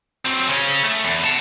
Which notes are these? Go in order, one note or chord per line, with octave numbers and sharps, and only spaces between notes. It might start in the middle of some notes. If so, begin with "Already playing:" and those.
F#3 C4
C#3 C#4
A3
E2
F#5 A5